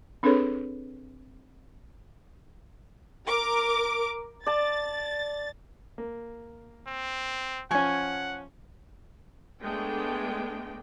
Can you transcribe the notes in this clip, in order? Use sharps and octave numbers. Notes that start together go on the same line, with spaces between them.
C4 D4 G#4 A4 B4 C#5
A#4 D6
D5 A5 A6
A#3
C4
F3 C#4 F#5 G#5 C#6
G#3 A3 B3 D4 G5